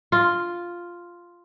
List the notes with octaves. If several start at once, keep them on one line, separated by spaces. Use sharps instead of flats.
F4